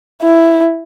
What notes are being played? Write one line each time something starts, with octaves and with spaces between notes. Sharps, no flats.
E4